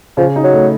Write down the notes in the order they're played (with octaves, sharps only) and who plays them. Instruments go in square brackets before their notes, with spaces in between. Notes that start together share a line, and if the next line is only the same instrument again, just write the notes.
[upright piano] C#3 [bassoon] F3
[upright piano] D#4
[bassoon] F#3
[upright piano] A3